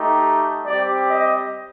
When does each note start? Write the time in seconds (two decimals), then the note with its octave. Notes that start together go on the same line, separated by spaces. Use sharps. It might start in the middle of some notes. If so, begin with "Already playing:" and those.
Already playing: A3 D#4 G4
0.65 G3 C4 G4 D5
1.09 D#5